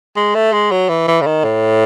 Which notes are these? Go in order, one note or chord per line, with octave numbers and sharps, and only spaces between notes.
G#3
A3
G#3
F#3
E3
E3
C#3
D#3
A2